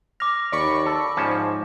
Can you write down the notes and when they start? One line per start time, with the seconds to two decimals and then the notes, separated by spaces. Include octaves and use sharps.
0.20 D6 F6 A#6
0.52 D#2 D5 B5 C#6
0.86 A4 A5
1.17 G#2 F3 C#4 A5